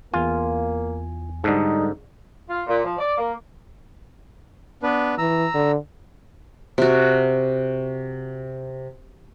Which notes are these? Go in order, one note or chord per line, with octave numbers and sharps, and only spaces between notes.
E2 A#3 F4 G#5
G#2 D3 G3 D#4 A4
F4
A#2
F3
D5
A#3
B3 D4 B4
E3 A#5 E6
D3
C3 F#4